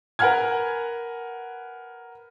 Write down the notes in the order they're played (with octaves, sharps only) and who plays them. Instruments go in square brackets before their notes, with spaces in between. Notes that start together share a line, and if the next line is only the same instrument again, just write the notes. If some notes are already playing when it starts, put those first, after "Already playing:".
[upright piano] A#4 B4 F#5 G#5 F6 G#6